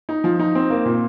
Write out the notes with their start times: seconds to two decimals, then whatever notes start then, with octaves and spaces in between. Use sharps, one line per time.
0.09 D#4
0.24 F3
0.39 D#4
0.55 C4
0.70 A#3
0.85 A#2